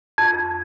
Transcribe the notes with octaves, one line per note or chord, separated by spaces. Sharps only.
F2